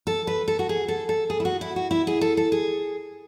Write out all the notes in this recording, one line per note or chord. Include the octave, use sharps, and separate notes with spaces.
A4
B4
A4
F#4
G#4
A4
A4
G#4
E4
F#4
E4
F#4
E4
G#4
A4
A4
G#4